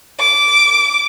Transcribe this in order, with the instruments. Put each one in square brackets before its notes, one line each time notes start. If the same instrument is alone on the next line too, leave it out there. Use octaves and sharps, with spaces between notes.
[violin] D6